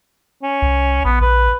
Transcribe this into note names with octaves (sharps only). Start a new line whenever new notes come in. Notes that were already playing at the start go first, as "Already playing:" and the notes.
C#4
C2
A#1 B3
A#1 B4